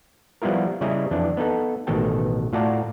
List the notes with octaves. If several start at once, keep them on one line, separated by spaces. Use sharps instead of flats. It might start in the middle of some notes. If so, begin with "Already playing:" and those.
F3 G3 B3 E4 F4 A#4
C#3 G3 E4 D#5 G#5 A#5
F2 E3 D4
B3 D#4 A4
A1 B2 D#3 A4 G5 A5
A2 F4 F#4 D5 A5 A#5